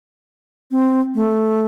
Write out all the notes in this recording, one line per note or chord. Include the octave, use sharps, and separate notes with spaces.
C4
A3